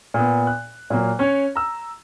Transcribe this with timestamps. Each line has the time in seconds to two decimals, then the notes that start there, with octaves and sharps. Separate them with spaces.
0.14 A#2 B3
0.47 F#6
0.90 A#2 F#3 A#3
1.19 C#4 C#5
1.55 A#5 E6